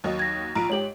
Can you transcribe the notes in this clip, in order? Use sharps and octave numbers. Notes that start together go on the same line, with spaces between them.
D#2 F#3 D#4
G#6 A#6
A#1 F4 A#5 D7
G#2 G4 C#5 F#7